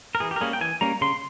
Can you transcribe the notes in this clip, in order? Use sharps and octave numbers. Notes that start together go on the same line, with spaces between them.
A#4
E3 G#4
G4
A#4
G3 A#3 C#4 G#4
G5
E3 G#5
G3 A#3 C#4 A#5
C#3 C6